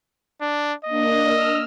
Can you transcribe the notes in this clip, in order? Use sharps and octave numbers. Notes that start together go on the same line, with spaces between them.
D4
A#3 D4 D#5
E6 F6